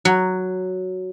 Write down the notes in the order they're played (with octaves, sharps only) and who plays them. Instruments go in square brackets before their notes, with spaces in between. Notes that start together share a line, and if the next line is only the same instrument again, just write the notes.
[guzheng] F#3